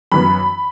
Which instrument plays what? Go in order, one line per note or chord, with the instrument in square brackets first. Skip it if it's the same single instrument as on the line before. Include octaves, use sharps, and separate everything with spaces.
[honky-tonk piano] F#2 E3 B3 B5